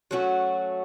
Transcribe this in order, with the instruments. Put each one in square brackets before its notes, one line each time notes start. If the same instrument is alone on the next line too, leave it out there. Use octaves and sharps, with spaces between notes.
[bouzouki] F#3 A3 C#4 F#4